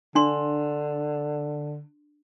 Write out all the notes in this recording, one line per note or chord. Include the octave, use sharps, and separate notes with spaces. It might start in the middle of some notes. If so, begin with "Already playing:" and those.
D3 D4 C6